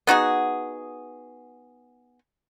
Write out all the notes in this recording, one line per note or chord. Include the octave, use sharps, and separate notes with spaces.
B3 D#4 F#4 G#4